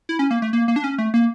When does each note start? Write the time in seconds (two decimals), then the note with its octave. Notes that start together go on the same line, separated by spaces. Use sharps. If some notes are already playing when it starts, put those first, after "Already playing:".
0.09 E4
0.19 C#4
0.31 A#3
0.42 A3
0.53 A#3
0.68 A#3
0.76 D4
0.84 C#4
0.98 A3
1.14 A#3